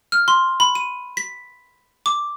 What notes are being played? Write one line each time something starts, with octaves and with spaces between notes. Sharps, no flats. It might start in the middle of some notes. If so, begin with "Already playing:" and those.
F6
C6
B5
D#7
B6
D6